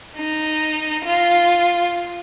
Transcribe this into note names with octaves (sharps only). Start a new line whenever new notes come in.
D#4
F4